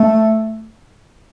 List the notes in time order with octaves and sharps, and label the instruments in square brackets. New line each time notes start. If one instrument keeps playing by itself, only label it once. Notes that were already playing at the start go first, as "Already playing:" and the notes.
Already playing: [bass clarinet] A3